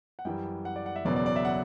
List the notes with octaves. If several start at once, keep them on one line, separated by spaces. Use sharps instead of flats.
F#5
F#2 E3 G3 G5
F#5
D5
F#5
E5
F#1 E2 B2 F#3 C#4 D5
D5
D5
E5
F#5